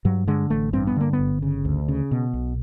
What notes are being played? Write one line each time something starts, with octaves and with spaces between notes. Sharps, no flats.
G2 F#3
D3 G#3
A1 A3
G2 C4
B3
D3 A#3
B3
G1
C#3
D2
C#3
B2
B1